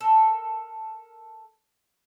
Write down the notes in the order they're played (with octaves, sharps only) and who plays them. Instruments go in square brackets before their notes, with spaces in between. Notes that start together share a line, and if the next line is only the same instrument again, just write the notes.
[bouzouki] A4 A#4